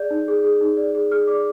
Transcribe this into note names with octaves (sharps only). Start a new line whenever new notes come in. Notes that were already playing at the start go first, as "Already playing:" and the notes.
Already playing: G#4 D5 G6
D#4
G#4
G#4
D#4
D5
G#4
G#4 F6
D5 D6